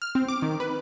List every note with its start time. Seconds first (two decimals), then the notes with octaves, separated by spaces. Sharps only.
0.02 F6
0.15 C4
0.28 D6
0.42 D#3
0.60 B4